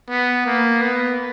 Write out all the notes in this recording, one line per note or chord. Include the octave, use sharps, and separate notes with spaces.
B3
A#3
B3